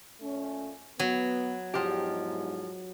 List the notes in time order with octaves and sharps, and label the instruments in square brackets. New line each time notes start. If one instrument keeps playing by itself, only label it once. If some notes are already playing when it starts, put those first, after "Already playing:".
[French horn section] A#2 A3 C#4
[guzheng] F#3 [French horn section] B3
[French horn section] E2 G#2 [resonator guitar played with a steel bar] F3 G4